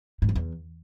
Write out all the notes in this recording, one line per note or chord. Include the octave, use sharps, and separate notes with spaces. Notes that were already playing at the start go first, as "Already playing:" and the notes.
G#2
F2
E2